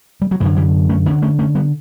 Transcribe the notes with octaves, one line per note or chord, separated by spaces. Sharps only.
G3
F#3
F#2 D3 E3
E3 G3
A3 C#4
D2 D3 A3 C#4
A3 C#4
A3 C#4
G3 B3